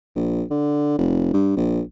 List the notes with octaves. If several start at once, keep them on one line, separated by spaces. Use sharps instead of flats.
A#1
D3
F1
G2
A#1